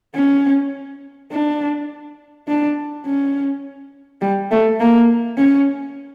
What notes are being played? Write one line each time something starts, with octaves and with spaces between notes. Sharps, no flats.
C#4
D4
D4
C#4
G3
A3
A#3
C#4